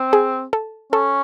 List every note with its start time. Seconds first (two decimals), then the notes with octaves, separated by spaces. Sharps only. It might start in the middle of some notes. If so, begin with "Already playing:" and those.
Already playing: C4
0.13 G#4
0.53 A4
0.93 C#4 A4